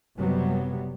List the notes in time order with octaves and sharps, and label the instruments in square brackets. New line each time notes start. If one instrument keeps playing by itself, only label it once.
[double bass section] F#1 C3 F#3 G3 B3